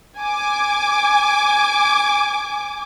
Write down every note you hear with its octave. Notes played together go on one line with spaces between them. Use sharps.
G#5 D6